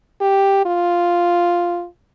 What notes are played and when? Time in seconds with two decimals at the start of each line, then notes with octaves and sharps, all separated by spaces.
0.21 G4
0.65 F4